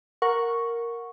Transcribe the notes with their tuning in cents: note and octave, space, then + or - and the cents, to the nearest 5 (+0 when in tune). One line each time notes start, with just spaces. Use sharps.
A#4 +0 F#5 -15 C#6 +0